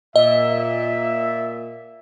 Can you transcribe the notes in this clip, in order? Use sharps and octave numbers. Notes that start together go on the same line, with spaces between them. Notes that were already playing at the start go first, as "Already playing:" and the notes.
A#2 D#5 E5